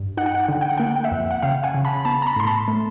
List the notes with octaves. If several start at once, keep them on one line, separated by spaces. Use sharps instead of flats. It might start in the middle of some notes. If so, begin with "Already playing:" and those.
Already playing: G2
D#4 F#5
G5
F#5
G5
D3 F#5
G5
F#5
A#3 G5
F#5
G5
E5 F#5
F2
F#5
C#3 F5 G5
F#5 G#5
C#3
A5 B5
B3 A5 B5
A#5
A5 B5
A2 C6
A5 B5
A3